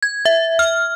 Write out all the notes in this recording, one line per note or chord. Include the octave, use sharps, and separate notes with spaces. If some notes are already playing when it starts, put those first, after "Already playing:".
G#6
E5
F6